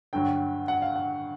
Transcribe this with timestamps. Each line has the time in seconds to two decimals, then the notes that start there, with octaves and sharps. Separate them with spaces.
0.13 G2 D3 F#3 G5
0.68 F#5
0.82 F5
0.96 F#5